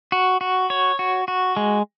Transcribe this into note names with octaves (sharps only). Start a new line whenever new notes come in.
F#4
F#4
C#5
F#4
F#4
G#3